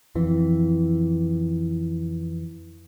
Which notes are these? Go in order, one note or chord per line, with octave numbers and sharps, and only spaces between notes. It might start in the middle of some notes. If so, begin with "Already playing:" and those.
F2 E3